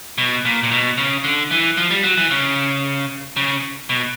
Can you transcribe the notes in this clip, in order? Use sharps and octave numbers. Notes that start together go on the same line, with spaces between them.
B2
A#2
A#2
B2
C#3
D3
E3
F3
G3
F#3
E3
C#3
C#3
B2